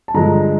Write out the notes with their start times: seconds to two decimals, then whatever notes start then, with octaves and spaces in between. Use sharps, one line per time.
0.08 A5
0.14 G2 D3 F3 G#3 A#5